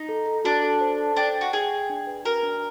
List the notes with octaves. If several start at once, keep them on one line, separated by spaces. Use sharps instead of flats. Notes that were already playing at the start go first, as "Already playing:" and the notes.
Already playing: D#4
A4
A4
D4 F#4
A4
C5
A4
D4 G5
G5
F#4
G#4 G5
G5
D4
B4
F#4 A#4
D4